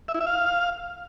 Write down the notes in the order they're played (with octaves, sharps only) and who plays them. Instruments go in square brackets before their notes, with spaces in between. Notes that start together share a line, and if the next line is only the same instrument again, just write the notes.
[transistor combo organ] E5
E4
E5
F5